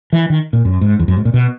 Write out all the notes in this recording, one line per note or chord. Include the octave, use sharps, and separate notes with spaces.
E3
D#3
A#2
F#2
G#2
E2
F#2
G#2
A#2
B2